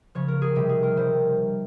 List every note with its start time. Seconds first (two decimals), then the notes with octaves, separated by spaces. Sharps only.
0.15 C#3 F3 C#5
0.28 A#4
0.42 G#4
0.55 C3 D#3 G3 G4
0.69 G#4
0.83 A#4
0.97 C3 D#3 G3 C5